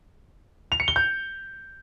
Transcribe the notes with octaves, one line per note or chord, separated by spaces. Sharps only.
F7
C#7
G7
G6